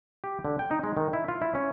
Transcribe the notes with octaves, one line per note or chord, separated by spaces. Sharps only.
G4
D3
G5
D#4
G#3
D#3
E4
F4
E4
C#4